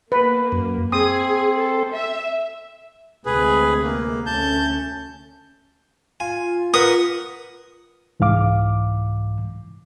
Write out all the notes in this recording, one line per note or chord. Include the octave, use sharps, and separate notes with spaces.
A#3 B4
F#2
C4 G#4 D#6
A4
E5
D2 C3 G#3 G#4 B4
A#3
D2 A3 C#4 A5 G6
F4 G#5
A#4 B4 F#5 D#6
C2 G#2 E3 F5 D6